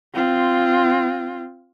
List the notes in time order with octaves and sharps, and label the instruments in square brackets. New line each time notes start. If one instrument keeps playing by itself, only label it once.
[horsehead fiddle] C4 F4